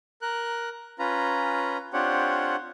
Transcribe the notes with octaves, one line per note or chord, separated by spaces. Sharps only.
A#4 F#6
C#4 F4 B4 A#5
C4 D4 F4 G4 C#5 F#5